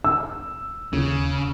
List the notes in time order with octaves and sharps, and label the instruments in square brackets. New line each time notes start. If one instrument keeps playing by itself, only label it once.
[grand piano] E6
[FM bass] D#2 [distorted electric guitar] C#3